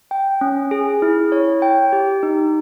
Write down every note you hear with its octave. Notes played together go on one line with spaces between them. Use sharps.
G5
C#4
G#4
E4
C#5
G5
G4
D#4